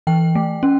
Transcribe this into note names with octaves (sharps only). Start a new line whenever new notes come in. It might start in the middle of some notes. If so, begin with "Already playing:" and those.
E3 G5
A3
C#4